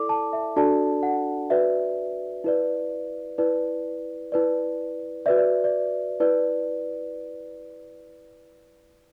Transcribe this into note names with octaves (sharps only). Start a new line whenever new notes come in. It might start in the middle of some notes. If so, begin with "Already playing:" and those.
Already playing: E4 A4 D5 D6
A5
E5
D4 F#4 A4 D5 A5
F#5
F#4 B4 D5 E5
E4 B4 D5
E4 B4 D5
E4 B4 D5
F#4 B4 D5 E5
D5
D5
E4 B4 D5